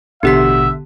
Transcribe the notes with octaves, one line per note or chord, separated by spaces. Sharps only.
A1 B2 D3 B3 G4 E5 F#5 B6